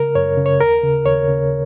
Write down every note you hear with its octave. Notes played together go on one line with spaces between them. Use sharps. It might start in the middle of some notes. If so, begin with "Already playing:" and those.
Already playing: C#3 A#4
F#2 C#5
C#3
C#5
D#2 A#4
C#3
D#2 C#5
C#3